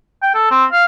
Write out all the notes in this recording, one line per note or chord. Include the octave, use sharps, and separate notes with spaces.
G5
A4
C4
F5